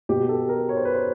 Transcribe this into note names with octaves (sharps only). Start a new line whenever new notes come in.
B2 G4
A4
A#4
C#5
C5
B4
C5